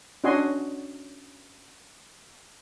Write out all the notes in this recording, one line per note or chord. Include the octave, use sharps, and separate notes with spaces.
C#4 D4 F#4 D#5 G#5 C6